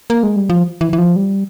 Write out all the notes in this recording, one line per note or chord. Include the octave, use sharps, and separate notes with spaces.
A#3
G#3
G3
F3
E3
E3
F3
G3